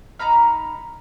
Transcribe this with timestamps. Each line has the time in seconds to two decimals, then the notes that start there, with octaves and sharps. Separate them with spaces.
0.19 D#4 A#5 B5 F6